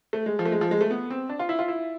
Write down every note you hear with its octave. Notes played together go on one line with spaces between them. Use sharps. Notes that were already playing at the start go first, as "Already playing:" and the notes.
A3
G#3
F3
A3
G#3
F3
G#3
A3
B3
C4
D4
F4
E4
F4
E4